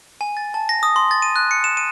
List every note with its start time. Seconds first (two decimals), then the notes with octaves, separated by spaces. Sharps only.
0.21 G#5
0.37 A6
0.54 A5
0.69 A#6
0.83 D#6
0.96 C6
1.11 A6
1.22 D#7
1.36 F#6
1.51 C#7
1.64 E7
1.77 D#7